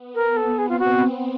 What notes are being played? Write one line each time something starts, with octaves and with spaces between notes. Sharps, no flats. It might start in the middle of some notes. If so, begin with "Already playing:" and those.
Already playing: B3
A#4
A4
C4 G#4
F4
F#4